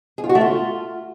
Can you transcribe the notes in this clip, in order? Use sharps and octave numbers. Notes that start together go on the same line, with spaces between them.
G#4
F4
F#4
A3
F4